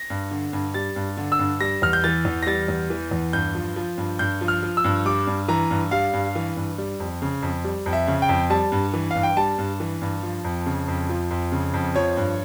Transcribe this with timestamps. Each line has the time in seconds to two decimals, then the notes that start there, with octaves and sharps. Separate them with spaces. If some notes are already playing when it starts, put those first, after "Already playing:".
Already playing: A#6
0.10 G2
0.31 D3
0.53 G2
0.74 G3 A6
0.96 G2
1.17 D3
1.32 E6
1.39 G2
1.60 G3 A#6
1.82 E2 F6
1.93 G6
2.04 E3 A6
2.25 E2
2.43 A#6
2.46 G3 A6
2.68 E2
2.90 E3
3.11 E2
3.33 G2 G6
3.55 F3
3.76 F3
3.98 G2
4.19 G2 G6
4.41 F3
4.48 F6
4.63 F3
4.77 E6
4.84 G2
5.05 G3 D6
5.27 G2
5.48 E3 A#5
5.71 G2
5.91 G3 F5
6.13 G2
6.35 E3
6.57 G2
6.78 G3
7.00 F2
7.22 C#3
7.42 F2
7.64 G3
7.86 F2
7.93 E5
8.08 C#3
8.22 G5
8.29 F2
8.50 G3 A5
8.72 G2
8.94 E3
9.11 G2 F5
9.23 G5
9.37 G3 A5
9.58 G2
9.80 E3
10.02 G2
10.23 F3
10.45 F2
10.66 C#3
10.88 F2
11.09 F3
11.31 F2
11.52 C#3
11.74 F2
11.95 F3 C#5
12.17 G2